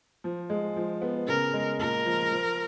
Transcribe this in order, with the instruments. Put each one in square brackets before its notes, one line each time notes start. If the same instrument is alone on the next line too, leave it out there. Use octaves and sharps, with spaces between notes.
[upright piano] F3
G#3
F3
B3
[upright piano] C#3 [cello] A#4
[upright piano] G#3
[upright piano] A#2 [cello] A#4
[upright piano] F3
F3